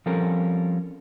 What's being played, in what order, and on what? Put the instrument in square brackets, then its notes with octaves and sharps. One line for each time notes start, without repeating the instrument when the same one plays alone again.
[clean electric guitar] F3 G3 C4 C#4 A4 A#4